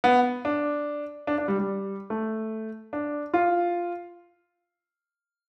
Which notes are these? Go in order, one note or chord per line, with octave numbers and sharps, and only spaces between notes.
B3
D4
D4
D4
G3
G3
A3
D4
F4